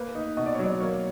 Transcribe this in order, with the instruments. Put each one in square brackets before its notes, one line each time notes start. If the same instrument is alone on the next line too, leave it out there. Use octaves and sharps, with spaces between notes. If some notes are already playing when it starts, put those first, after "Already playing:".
Already playing: [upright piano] A#3 [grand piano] B4
[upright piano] D#4
[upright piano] B2 [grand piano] D#5
[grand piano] D5
C#5
[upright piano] F#3 [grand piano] D5
[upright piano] A#3 [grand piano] C#5